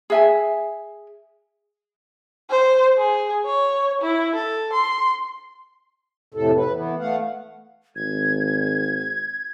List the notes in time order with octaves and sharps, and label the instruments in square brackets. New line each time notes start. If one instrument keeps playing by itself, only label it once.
[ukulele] G#4 E5 G#5
[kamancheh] C5
G#4
C#5
E4
A4
C6
[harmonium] F2 A2 C3 A4
B4
E3 B3
A3 F5 F#5
[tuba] G#1 [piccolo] G#6